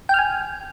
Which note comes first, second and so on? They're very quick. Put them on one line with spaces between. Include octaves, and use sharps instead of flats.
G5 F6 G#5